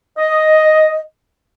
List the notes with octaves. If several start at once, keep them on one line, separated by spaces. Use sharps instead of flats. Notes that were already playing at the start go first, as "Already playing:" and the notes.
D#5